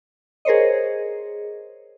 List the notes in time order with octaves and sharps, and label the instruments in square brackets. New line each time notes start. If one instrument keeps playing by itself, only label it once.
[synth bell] G#4 A#4 C5 C#5 D#5